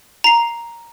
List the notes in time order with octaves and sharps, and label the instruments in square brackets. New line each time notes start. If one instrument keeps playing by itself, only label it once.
[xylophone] A#5 C7